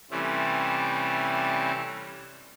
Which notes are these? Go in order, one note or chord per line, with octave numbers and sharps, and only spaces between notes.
C3 E3 G3 A3 C4 C#4